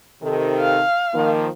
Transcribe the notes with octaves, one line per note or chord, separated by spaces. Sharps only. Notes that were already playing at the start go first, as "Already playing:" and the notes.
C3 D#3 A4
F5
D#3 F3 A#3